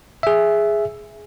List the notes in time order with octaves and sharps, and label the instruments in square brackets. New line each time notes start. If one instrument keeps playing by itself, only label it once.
[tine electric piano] G#4 E5